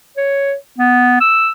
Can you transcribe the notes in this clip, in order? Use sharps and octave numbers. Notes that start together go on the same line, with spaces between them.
C#5
B3
E6